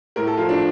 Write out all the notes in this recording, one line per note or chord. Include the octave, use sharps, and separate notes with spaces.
A2 A#4
A4
F3 F4
D4